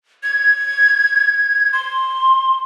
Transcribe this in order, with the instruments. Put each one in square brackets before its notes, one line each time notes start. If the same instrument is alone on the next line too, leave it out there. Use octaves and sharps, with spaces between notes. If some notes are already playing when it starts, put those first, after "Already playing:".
[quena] G#6
C6